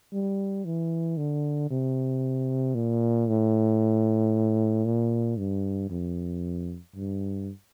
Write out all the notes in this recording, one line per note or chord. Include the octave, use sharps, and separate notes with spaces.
G3
E3
D3
C3
A#2
A2
A#2
G2
F2
G2